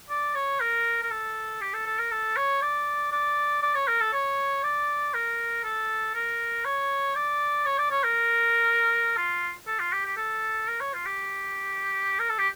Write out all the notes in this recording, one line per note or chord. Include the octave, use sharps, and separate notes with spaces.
D5
C#5
A#4
A#4
A4
G4
A4
A4
A#4
A4
C#5
D5
D5
D5
C#5
A#4
A4
C#5
D5
A#4
A4
A#4
C#5
D5
C#5
D5
C#5
A#4
F4
A4
F4
G4
G4
A4
A#4
C#5
F4
G4
A#4
A4
G4